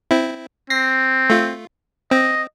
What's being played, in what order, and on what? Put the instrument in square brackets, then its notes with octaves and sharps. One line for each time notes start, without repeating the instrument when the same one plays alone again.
[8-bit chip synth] C4 E4
[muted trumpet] C4 [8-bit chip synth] A#6 C7
[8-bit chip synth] A3 F4
[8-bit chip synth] C4 [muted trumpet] D#5